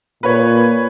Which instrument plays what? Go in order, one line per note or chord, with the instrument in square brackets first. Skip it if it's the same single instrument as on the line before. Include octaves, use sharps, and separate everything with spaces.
[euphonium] A#2 [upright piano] B4 C#5